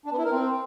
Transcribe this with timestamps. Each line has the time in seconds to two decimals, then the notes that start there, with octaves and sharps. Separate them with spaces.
0.06 D4
0.12 B3
0.18 E4
0.25 A#4
0.31 C4